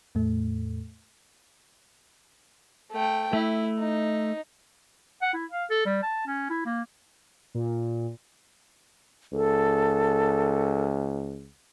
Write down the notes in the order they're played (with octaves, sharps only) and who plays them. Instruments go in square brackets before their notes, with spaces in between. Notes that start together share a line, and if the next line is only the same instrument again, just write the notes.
[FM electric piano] E2 A2 A3
[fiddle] A3 G5
[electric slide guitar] A3 [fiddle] E4
[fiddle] D#4
[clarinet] F#5
E4
F5
A4
G3
A5
C#4
E4
A#3
[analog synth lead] A#2
[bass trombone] C#2 [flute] A4